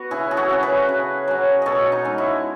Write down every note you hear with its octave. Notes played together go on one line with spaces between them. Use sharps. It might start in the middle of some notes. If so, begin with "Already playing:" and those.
Already playing: B3 F#4
C#3 E4 G#4
G#4
F#4 A4
F#3 C#4
G#4 B4
C#3
F#3 C#4
B2 A4 C#5 D#5
D#4
G#3 C#4
E4